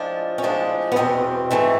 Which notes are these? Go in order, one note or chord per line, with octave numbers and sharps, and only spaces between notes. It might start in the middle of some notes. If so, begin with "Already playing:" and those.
Already playing: A2 F3 G#3 D4
C#4
A2 F3 G#3 D4
B3
E2 B2 G3 C4
G#2 E3 A3